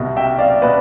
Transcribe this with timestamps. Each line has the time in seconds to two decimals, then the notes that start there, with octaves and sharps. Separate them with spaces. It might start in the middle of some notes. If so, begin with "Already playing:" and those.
Already playing: C2 B2
0.17 E5 G5
0.38 D5 F5
0.62 B2 B4 D5